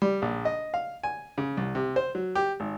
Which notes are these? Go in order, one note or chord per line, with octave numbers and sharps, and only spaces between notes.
G3
A#1
D#5
F5
G#5
C#3
C2
C3
C5
F#3
G4
G#1